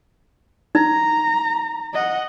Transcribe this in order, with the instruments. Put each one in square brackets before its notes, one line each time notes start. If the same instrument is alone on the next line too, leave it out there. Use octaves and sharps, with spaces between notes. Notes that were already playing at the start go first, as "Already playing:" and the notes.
[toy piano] D#4 [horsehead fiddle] A#5
[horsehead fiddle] D#5 F#5